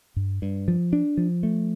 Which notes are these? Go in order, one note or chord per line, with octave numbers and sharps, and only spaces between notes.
G2
G2
F3
D4
F3
A3